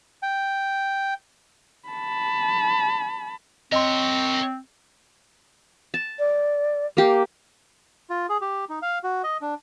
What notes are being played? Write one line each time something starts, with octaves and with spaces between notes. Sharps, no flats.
G5
A5 B5
C4 A#4 C#5 D#5 C6
A5
D5
A#3 G4
F4
G#4
G4
D#4
F5
F#4
D#5
D4